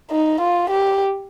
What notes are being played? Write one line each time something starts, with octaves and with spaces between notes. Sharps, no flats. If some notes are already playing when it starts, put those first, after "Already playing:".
D#4
F4
G4